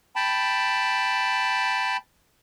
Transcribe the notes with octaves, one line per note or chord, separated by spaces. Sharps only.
G5 A5 B5